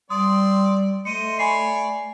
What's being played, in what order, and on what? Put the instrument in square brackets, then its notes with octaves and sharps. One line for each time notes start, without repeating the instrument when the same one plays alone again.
[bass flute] G3 [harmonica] C4 D5 C6 [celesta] D#6
[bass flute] A3 [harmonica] C5 D#5 [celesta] C#7 D#7
[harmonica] C#5 D5 [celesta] G#5 B5 C7